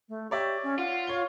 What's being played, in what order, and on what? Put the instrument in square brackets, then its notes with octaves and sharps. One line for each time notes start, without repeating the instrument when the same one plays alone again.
[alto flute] A3
[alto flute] G4 [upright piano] C#5 D5 E5
[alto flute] C#4
[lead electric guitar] F4 [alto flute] F#5
[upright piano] C#5 G7